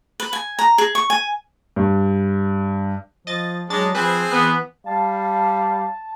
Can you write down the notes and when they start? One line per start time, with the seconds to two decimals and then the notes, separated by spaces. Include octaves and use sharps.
0.20 B4
0.33 G#5
0.59 A#5
0.78 G#4
0.95 C#6
1.10 G#5
1.76 G2
3.27 F3 D#5 A6
3.70 F#3 G#3 D4 A6
3.95 F3 C4 G#4 B4 C5 G#5 F#6
4.31 E3 B3 F#6
4.86 G3 F5 A5